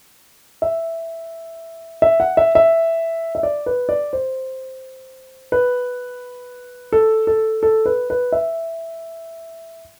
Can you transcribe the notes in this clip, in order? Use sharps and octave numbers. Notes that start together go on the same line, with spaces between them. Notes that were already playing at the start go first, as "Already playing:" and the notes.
E5
E5
F#5
E5
E5
E5
D5
B4
D5
C5
B4
A4
A4
A4
B4
B4
E5